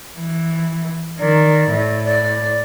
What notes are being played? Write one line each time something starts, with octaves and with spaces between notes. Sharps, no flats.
E3
D#3 D5
A2
D5